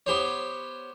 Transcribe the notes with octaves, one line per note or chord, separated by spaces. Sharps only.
B3 G4 C5 C#5